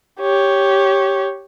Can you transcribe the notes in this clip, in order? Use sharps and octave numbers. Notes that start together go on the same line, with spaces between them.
G4 C#5